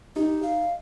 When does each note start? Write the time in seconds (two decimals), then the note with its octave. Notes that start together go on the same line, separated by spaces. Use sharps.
0.16 D#4 G4
0.43 F5